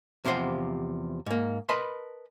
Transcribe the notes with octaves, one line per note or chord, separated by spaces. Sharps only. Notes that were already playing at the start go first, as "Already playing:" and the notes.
E2 C3 F3 G4 C5 F#5
G#2 A#3
A#4 B4 D#5 A5 B5 C6